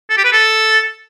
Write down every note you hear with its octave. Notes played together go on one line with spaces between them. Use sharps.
A4
G4
B4
A4